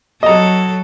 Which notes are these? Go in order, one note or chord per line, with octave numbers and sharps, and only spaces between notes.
F#3 A4 D#5 A#5